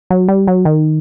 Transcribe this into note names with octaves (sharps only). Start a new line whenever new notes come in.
F#3
G3
F#3
D#3